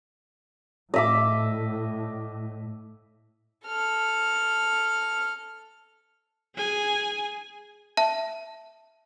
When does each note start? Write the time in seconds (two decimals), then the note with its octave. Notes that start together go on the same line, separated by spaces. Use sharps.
0.94 A2 D#5 E5 D6
3.66 A4 F6
6.55 G#4 G#5
7.97 E5 A5